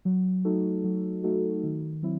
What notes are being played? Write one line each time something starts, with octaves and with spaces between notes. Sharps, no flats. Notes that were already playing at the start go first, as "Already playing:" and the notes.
F#3
A3 D#4 F#4 A4
F#3
A3 D#4 F#4 A4
D#3
F#3 C4 E4